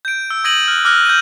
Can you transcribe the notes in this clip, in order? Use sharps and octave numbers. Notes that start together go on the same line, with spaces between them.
G6 D7
E6
D#6 G#6 A#6 D7 D#7 F#7
F6 F#6
D6 F6 F#6 A#6
G6 D#7